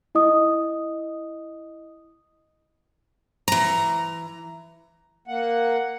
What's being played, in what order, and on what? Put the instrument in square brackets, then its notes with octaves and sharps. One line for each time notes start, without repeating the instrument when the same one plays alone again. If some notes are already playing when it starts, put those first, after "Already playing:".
[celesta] E4 D#5 D#6
[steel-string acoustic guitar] E3 A#5
[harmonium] A#3 F#5